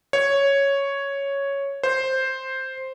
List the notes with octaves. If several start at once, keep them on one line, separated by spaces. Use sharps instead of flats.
C#5
C5